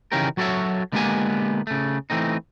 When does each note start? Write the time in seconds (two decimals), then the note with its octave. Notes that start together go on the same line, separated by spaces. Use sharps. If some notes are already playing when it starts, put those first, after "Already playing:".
0.12 C#3 E3 C#4 D#4 G4 A#4
0.37 F#3 F#4 A4 B4 C#5 E5
0.92 D3 G#3 A#3 B3 G4 G#5
1.67 C#3 A3
2.10 E3 A3 C4 D#4